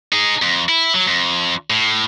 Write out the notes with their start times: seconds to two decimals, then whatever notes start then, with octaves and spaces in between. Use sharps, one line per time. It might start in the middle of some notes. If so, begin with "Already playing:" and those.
0.12 D#4 G#4
0.42 F2
0.69 E4
0.94 F#3
1.07 F2
1.70 A2